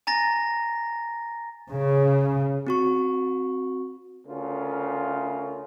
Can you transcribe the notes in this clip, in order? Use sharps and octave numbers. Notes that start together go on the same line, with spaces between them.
G#5 A#5 A6 A#6
C#3
C4 F#4 C#6
D2 C#3 C#4 F4 A#4